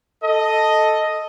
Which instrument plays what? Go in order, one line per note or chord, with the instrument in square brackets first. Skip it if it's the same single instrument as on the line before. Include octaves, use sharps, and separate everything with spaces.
[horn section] A4 D#5